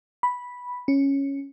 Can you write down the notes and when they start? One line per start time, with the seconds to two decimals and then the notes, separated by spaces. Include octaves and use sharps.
0.23 B5
0.88 C#4